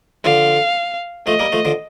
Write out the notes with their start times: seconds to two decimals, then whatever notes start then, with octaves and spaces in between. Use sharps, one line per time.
0.24 D3 F3 F5
1.26 F3 A3 D#5
1.39 G3 A#3
1.52 F3 A3
1.65 D3 F3